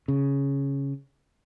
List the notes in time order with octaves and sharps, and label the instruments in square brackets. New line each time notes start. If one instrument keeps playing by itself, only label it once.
[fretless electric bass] C#3